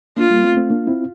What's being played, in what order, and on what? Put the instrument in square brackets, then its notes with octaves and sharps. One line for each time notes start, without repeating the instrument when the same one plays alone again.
[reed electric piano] A#3 D4 [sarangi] F4
[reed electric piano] G3 A#3
A3 C4
A3 C4
A#3 D4
C4 E4